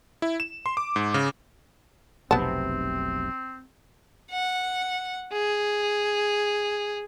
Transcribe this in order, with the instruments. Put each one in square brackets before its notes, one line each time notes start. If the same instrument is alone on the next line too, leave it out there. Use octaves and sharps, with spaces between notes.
[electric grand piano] E4
E7
C6
D6
G#2
C#3
[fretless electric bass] F1 B1 C3 [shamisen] B3 A5 [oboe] C4
[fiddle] F#5
G#4